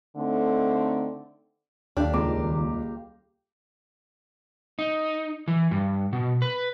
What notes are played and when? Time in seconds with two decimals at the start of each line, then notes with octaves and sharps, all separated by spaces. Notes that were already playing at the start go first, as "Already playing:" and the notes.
0.17 D3 A3 C4 D#4
1.97 D#2 D4 G4 A4 F5
2.13 D#1 C#2 A#5 C6 D6
4.79 D#4
5.48 E3
5.71 G2
6.13 B2
6.42 B4